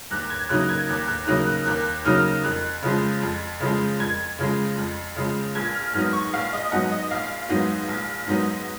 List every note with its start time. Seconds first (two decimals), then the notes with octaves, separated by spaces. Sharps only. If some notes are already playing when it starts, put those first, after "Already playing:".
0.10 D#2 F#6
0.30 G#6
0.49 C#3 F#3 A#3 D#4 F#6
0.69 G#6
0.89 D#2 F#6
1.08 F#6
1.27 C#3 F#3 A#3 D#4 F#6
1.47 F#6
1.66 D#2 F#6
2.05 C#3 F#3 A#3 D#4 F6
2.44 F2 F#6
2.82 C#3 F3 G#3
3.22 F2
3.60 C#3 F3 G#3
3.99 F2 G#6
4.39 C#3 F3 G#3
4.78 F2
5.16 C#3 F3 G#3
5.55 A#1 G#6
5.75 F6
5.93 G#2 F#3 B3 D#4 F6
6.13 C#6
6.33 A#1 F5
6.53 D#5
6.72 G#2 F#3 B3 D#4 F#5
6.91 D#5
7.11 A#1 F5
7.49 G#2 F#3 B3 D#4
7.89 A#1
8.27 G#2 F#3 B3 D#4